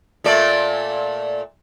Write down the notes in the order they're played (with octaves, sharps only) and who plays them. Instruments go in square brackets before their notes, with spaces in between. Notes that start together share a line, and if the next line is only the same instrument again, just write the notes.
[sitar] A#2 A3 D5